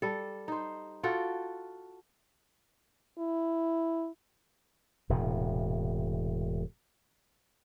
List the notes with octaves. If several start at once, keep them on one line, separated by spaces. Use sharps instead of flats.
G3 A4
D#4 C5
F4 F#4 A4 G5
E4
E1 A2 C3